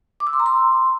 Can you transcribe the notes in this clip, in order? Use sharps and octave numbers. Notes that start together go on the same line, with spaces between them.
D6
E6
C6
A#5
C6